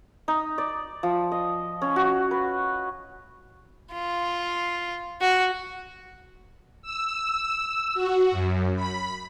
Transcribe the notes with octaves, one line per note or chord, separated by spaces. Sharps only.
D#4
D5
F3
D#5
C#4
F#4
B4
F4
F#4
E6
F#4
F#2
B5